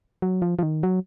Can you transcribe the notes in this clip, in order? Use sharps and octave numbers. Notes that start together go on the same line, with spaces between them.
F#3
F3
F3
D#3
F#3